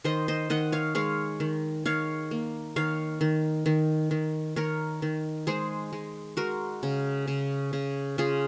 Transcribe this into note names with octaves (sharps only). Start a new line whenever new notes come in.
D#3 C5 D#5
C5 D#5
D#3 D#5 F#5
C#5 F5
G#3 C#5 F5
D#3
D#3 C#5 F5
A#3
D#3 C#5 F5
D#3
D#3
D#3
D#3 A#4 C#5
D#3
G#3 G#4 C5
G#3
G#3 F#4 A#4
C#3
C#3
C#3
C#3 F4 G#4